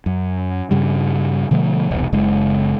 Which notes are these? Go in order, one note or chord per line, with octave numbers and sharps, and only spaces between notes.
F#2
G2 C#3 G3
B2 D3 F3 A3
E1 C2
F#1 C#3 G#3